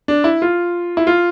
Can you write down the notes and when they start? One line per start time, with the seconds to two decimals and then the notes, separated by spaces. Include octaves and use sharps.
0.08 D4
0.24 E4
0.42 F4
0.97 E4
1.07 F4